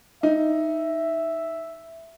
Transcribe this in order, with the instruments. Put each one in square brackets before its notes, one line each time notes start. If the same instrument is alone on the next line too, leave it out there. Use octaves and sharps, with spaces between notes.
[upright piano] D#4 [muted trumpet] E5